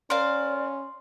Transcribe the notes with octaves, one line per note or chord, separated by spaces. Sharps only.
C#4 A#4 C5 D5 F5 C6